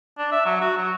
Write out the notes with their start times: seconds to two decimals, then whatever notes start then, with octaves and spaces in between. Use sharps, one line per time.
0.18 D4
0.32 E5
0.45 F#3
0.61 F#4
0.77 F#3